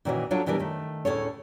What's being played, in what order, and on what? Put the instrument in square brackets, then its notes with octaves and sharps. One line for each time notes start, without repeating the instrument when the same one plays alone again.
[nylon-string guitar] A#2 D#3 E3 C#4 F#4 D#5
F#3 D4 F4 A4 C#5 D5
B2 E3 G3 D4 A#4
D#3 A3
D2 A2 C#4 G#4 A4 C#5